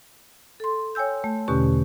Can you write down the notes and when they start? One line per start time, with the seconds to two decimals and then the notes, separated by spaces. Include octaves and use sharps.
0.60 A4 C6
0.95 C#5 G5 G#5 E6 G6
1.24 A3
1.48 E2 B2 D3 C#4 G4 C#6